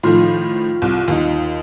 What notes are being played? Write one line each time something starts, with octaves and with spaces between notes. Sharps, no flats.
A2 D#3 F3 F4
C2
D#2 D#4